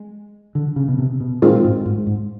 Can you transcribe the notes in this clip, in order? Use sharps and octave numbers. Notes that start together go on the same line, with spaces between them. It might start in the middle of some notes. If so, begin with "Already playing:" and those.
Already playing: G#3
D3
C#3
B2
C3
B2
F#2 A#2 D#3 G#3 C4 F4
G#2
G#2
G#2